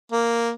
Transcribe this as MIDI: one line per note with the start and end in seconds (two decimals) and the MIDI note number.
0.12 0.50 58